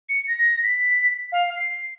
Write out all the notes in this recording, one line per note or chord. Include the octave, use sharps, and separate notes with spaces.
C#7
A#6
B6
F5
C7